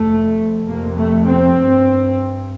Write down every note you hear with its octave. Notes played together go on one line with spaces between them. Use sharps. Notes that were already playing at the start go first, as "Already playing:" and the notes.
Already playing: F2 C3 A3
F2 C3 A#3
A3
C4
G2